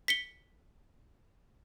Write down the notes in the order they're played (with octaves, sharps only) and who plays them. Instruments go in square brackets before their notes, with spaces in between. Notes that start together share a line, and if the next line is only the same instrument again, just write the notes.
[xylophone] B6 C#7 G7